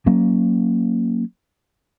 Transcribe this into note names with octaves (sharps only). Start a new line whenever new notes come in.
F#3 A#3 C#4